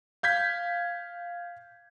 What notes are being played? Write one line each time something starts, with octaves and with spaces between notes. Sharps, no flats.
F5 G6 G#6 B6